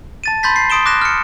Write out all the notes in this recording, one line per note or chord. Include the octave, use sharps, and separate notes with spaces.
A5 A6 D#7
B5 C6 G6 A6 B6
C7
C6 D#6 D7 E7 G7
D6 F#6 A#6 E7
F6 C#7